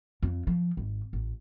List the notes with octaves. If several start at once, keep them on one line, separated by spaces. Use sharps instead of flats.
F2
F3
G#1
A1